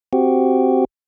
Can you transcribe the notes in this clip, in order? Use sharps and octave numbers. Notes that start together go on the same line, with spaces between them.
C4 F#4 G4